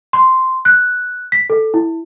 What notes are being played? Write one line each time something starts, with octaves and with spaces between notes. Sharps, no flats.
C6
F#6
B6
A4
E4